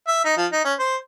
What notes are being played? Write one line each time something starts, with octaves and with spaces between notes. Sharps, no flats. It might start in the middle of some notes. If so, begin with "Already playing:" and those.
E5
D#4
F3
D#4
C#4
C5